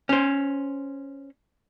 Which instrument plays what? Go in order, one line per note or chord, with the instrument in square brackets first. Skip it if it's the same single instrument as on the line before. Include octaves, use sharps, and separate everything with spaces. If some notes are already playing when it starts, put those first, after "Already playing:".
[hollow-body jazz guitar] C#4 C5